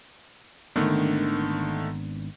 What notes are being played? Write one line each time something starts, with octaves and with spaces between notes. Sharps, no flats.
G#1 D3 D#3 A3 B3 D4